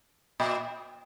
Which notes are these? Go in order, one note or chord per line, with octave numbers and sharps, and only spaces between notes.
A#2